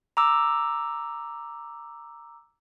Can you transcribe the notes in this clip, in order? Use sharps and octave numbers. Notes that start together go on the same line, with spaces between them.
A#5 D6 E6